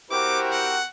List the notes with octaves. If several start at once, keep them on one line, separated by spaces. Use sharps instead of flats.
C4 E4 F#4 G4 A#4 C5 D6
F#5